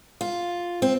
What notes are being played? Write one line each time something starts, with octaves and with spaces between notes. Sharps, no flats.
F4
C4